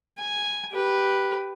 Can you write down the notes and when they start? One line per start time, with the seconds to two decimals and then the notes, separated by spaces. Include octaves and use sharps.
0.18 G#5
0.72 G4 B4